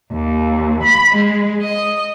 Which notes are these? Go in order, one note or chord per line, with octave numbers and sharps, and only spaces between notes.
D#2
B5
G#3
D#5